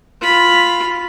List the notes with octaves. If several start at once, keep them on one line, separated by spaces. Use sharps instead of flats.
F4 B5